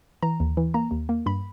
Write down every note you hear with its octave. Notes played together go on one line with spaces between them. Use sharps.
E3 A#5
D#2
E3
A#3 A#5
D#2
A#3
G2 B5